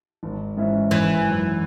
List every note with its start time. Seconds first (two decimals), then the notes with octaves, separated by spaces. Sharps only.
0.23 G#1
0.57 G#2 E3 C#4 E4
0.91 G#1 E3
1.24 F#2 F#3